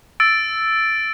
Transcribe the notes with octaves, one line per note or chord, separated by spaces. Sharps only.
E6 A6 D7